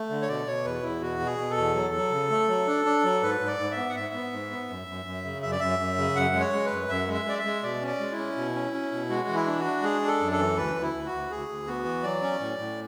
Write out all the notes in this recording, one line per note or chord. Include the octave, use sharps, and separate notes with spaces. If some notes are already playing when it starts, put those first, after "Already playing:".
Already playing: A3
D3
C#5
B2 D5
B2 C#5
E2 B4
E2 E4
B2 F#4
B2
G#4
B2
A4
E2
F#3
F#3
C#3
A3
F#3
D4
D4
F#3
G#2 B4
G#2
D5
G#2
E5
B3
F#5
G#2 E5
B3
G#2
B3
F#2
F#2
F#2
C#3
F#2 E5
D5
F#2 E5
F#2
C#3
F#2 F#5
G#3
C#5
G#3
B4
F#2
F#2 E5
G#3
E5
G#3 D5
E5
G#3
B2 D5
C#4
D5
G#3
E4
C#4
B2
C#4
C#4
B2
G#3 F#4
E3
E4
D4
F#4
D4
G#3 G#4
D4
A4
F#2
A4
E3
D2 B4
D2
E4
D2
F#4
D2
D2 G#4
D2
B3 F#4
E3
F#3 D5
C#4
A2
A2